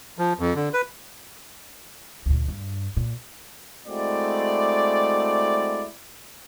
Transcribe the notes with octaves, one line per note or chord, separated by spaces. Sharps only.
F3
F2
D3
B4
D2 A#2
G2
A#2
G#3 A3 C4 E4 F#4 D5